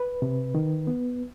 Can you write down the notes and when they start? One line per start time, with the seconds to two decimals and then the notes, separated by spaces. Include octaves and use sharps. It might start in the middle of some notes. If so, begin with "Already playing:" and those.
Already playing: B4
0.22 C3
0.55 D#3
0.87 B3